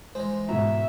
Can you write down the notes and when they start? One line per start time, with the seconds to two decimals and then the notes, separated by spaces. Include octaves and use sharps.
0.15 E3 G#3 C5
0.49 G#2 B2 E4 E5 A#5